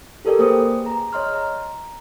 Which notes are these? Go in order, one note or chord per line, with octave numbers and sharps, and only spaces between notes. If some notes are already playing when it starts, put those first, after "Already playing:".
G4 A4 A#4 D5 G5
A#3 G#4 B4 C5 G5 D#6
G#4 A#5
C#5 D#5 C6 F6
A#5